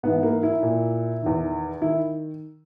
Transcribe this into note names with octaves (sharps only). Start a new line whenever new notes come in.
G#2 E3 B3
A#3
E4
A#2
E2 D#3
D#3 E4